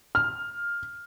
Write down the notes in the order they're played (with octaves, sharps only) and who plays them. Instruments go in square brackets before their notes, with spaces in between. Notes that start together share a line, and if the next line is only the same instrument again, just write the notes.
[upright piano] F6